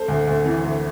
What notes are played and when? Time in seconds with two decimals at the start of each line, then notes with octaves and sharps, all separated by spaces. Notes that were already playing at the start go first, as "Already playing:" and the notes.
Already playing: A4 C5
0.08 D2
0.27 D2
0.46 E3
0.64 D2